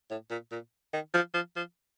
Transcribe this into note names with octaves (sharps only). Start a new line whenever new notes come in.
A2
A#2
A#2
D#3
F3
F3
F3